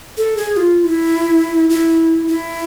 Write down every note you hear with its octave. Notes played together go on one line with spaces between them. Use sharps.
A4
G#4
F4
E4
E4
E4